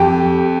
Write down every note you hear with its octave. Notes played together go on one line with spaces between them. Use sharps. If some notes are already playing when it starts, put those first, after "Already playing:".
Already playing: F2 G4 G5